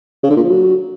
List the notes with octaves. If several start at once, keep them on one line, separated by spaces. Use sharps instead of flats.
C#3
D3
A#2
F3
F#3